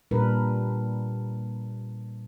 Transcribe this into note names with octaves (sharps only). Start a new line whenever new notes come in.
A#2 G3 D4 A#4 B4